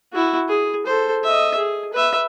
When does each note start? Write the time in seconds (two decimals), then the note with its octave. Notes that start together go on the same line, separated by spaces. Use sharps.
0.13 E4 F#4
0.48 G#4
0.86 A4 C5
1.24 D#5 E5
1.57 G#4
1.93 B4 E5